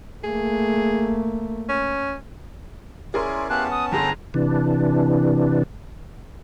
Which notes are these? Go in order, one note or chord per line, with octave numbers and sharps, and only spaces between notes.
A3 A#3 G#4
C#4
C#4 E4 G#4 A#4 D5 C6
B3 C#4 E4 G4 F5 A5 F#6
F#5 D#6
G1 G#4 A4 B4 G5 A#5 C6
C3 E3 D4